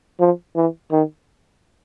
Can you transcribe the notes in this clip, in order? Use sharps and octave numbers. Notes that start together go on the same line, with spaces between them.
F3
E3
D#3